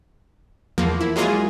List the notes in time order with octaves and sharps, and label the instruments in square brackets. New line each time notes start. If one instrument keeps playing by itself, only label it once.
[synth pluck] E2 F3 A#3
E4
F#3 G#3 A#3 F4 G#4